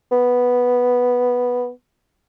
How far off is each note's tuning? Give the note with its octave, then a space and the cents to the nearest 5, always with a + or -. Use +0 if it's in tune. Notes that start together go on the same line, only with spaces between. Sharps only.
B3 -5